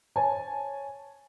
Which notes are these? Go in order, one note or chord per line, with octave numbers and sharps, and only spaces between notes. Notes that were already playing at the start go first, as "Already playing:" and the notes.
C5 C#5 G#5 A5